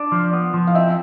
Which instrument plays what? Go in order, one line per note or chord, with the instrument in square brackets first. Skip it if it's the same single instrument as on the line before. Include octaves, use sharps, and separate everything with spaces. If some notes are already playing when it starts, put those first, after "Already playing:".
Already playing: [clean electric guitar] D4
F3
B3
F3
[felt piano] F5
[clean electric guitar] C4 [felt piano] E5